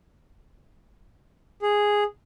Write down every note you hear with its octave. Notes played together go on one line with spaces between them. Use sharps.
G#4